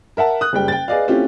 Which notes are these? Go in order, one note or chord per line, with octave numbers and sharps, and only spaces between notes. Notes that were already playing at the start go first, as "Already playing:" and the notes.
A#4 E5 F#5 A5
D#6 F#6
F#1 G3 G5
G5 A6
G#4 B4 D5 D#5 F5
A3 C4 C#4 E4 F4 G4